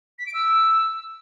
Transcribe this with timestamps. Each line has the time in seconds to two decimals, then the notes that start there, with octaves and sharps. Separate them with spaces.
0.19 B6
0.26 D7
0.34 E6